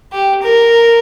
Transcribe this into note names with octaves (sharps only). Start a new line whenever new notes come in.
G4
A#4